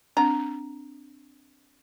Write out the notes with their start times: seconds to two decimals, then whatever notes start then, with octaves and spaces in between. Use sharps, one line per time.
0.17 C4 D4 A#5